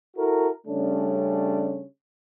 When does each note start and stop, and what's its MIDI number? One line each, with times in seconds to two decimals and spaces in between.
0.17 0.50 64
0.17 0.50 66
0.17 0.50 69
0.17 0.50 70
0.67 1.84 49
0.67 1.84 55
0.67 1.84 57
0.67 1.84 61
0.67 1.84 62